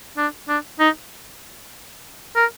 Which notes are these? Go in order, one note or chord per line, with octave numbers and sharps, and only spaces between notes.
D4
D4
D#4
A#4